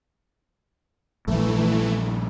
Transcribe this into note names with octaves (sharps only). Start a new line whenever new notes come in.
A#1 G2 E3 A3